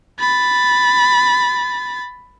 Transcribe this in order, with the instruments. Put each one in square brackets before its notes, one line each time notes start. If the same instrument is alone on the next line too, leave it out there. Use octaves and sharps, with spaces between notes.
[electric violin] B5 A6